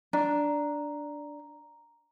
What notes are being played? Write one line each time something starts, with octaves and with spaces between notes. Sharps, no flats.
D4 A#5